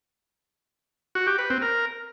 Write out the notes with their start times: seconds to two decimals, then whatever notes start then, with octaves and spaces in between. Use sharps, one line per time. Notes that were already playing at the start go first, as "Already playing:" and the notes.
1.15 F#4
1.27 G4
1.39 B4
1.50 C4
1.62 A#4